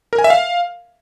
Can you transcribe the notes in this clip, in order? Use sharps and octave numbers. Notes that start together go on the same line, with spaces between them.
A#4
G#5
E5
F5